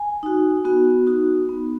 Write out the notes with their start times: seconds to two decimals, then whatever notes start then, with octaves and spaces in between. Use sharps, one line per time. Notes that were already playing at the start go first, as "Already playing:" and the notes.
Already playing: G#5
0.23 D#4 F#4
0.65 B3 F#4
1.07 D#4 F#4
1.49 B3